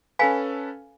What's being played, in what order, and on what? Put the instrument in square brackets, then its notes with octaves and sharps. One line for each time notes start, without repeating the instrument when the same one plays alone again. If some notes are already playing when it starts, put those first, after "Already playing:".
[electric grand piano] C#4 A4 B4 [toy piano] F5 G#5 B5